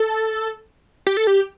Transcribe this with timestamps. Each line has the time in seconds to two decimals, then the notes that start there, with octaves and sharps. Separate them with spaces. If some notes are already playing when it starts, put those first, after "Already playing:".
Already playing: A4
1.07 G4
1.17 A4
1.27 G4